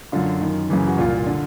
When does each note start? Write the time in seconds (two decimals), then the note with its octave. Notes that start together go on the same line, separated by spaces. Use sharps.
0.12 F#2 D3 F4
0.41 F#2 D#3
0.70 F#2 C#3 E3
0.87 F#4
0.98 C2 A#2 F4
1.27 D3